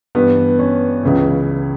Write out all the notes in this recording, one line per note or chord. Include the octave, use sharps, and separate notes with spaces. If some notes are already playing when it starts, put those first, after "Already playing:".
G2 E3 B3
C#4
C#2 C#3 E3